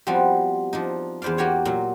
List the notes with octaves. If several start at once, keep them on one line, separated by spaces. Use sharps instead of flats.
F3 G3 B3 C4 F#4
F3 D4 D#4
E2 B4 C5 D5 F5
A#3 F#4 G4 C#5 F#5
A#2 F#3